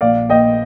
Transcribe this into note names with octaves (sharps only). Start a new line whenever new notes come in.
A#1 D5 F5
A#1 D#5 G5